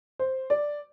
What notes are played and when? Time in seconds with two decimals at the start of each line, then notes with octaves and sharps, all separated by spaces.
0.19 C5
0.50 D5